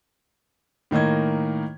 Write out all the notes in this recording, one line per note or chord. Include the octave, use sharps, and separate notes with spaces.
A2 D#3 A#3 D#5 G#6